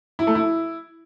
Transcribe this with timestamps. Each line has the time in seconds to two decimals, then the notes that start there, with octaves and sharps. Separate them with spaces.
0.19 E4
0.27 A3
0.35 E4